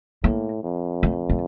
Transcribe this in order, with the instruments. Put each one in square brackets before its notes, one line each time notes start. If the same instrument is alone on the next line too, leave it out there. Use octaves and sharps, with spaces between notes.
[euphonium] A2 [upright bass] A#3
[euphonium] F2
[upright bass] A3
A3